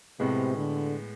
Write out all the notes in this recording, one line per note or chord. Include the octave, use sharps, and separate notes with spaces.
A2 C3 G#3 B3
D3